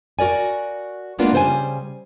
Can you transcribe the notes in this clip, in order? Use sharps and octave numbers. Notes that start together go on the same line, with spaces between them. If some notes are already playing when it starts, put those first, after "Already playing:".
F#4 A#4 D5 G#5
G#3 A#3 B3 D4 F4 A#4
C#3 G3 C5 D#5 G#5